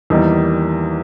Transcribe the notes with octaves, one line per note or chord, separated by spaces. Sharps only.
E2 D#3 G3 A#3 D#4